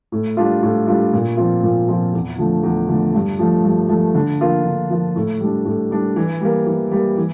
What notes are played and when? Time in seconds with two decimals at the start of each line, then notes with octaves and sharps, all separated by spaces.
0.12 A2
0.37 G3 D4 F4
0.62 A2
0.87 G3 D4 F4
1.13 A#2
1.37 F3 C4 F4
1.63 A#2
1.88 F3 C4 F4
2.13 E2
2.38 D3 F3 A3
2.63 E2
2.89 D3 F3 A3
3.14 G2
3.39 F3 A3
3.64 G2
3.89 F3 A3
4.15 D3
4.40 F3 A#3 F4
4.65 D3
4.90 F3 A#3 F4
5.16 A2
5.41 G3 D4
5.65 A2
5.91 G3 D4
6.16 E3
6.41 G3 A#3
6.66 E3
6.91 G3 A#3
7.17 E3